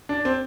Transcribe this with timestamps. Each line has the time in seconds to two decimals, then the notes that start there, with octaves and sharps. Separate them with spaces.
0.09 D4
0.25 C4